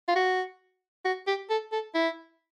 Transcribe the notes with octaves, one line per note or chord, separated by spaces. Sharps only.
F4
F#4
F#4
G4
A4
A4
E4